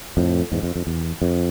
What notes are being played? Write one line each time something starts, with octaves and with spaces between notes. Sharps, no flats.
F2 A2
E2 G#2
F2
F2
E2
F2